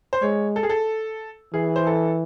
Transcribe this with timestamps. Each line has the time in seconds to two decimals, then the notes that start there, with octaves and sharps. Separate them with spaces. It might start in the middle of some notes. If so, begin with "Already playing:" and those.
0.13 C5
0.22 G#3 C#5
0.56 A4
0.63 G#4
0.69 A4
1.53 E3 G#4
1.76 C5
1.87 A4